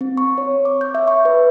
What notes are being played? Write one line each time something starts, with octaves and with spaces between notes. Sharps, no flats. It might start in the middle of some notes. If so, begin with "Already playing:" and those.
C4
C#6
C#5
D6
G6
E5
C#6
B4